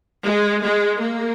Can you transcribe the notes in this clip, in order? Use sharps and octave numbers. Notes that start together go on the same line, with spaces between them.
G#3
G#3
A#3